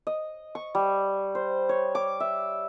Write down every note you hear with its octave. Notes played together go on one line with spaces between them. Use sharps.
D#5
C#6
G3
C5
C#5
D6
E5